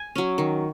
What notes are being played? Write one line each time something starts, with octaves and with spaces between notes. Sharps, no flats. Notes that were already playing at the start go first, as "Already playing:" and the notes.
Already playing: G#5
F#3 C#4
D#3